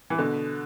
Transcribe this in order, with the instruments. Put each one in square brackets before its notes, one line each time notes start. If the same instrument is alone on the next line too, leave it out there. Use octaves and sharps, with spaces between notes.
[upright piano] E3
B2 D3